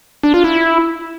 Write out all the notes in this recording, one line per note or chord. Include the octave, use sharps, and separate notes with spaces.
D4
F4
E4